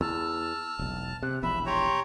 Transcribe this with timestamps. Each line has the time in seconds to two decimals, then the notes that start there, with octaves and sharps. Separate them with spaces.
0.01 E2 A5 E6 F6
0.79 E1 B1
1.23 C3 F#6
1.43 E1 A#1 E2 E5 B5
1.66 G4 C#5 A#5 C6